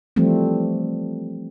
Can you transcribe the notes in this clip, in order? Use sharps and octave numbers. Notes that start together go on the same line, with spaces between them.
E3 F3 G3 A3 C4